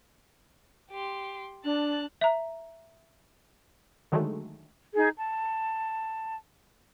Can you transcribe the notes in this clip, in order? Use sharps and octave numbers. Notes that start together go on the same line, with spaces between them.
G4 C6
D4 A5 F#6
E5 A#5
D3 D#3 F#3 G#3 A3
D#4 G#4
A5